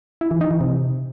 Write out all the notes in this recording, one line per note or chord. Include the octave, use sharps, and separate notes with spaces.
E4
E3
D#4
E3
C3